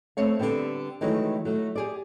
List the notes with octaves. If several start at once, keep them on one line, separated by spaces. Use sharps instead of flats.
A3 C4 C#5 F5
D3 G3 B3 C4
D#3 E3 F#3 G#3 A3 D#4
F#3 A3
G4 G#4 D5